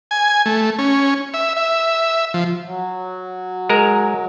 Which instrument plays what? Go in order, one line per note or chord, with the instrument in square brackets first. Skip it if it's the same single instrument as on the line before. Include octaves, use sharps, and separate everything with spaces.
[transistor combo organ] G#5
A3
C#4
E5
E5
F3
[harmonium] F#3
[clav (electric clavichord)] G#3 A#4 A#5